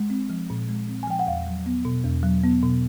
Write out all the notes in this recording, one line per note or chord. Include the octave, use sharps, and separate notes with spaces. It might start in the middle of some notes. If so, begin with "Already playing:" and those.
Already playing: G#3
C4
F3
A#2
G#3
C4
G#5
F3 G5
F#5
E2 F5
F#3
B3
B2
E2
F#3
B3
B2